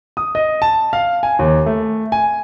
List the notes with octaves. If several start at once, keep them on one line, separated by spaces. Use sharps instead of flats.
D#6
D#5
A5
F5
G#5
D#2
A3
G#5